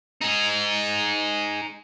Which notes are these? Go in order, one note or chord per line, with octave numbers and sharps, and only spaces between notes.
D#4 G#4